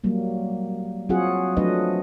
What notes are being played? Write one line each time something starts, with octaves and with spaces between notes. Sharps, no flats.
F#3 G3 A#3
F#3 C4 F4 F#4 G#4 F#5
F3 F#3 A3 D4 B4 D#5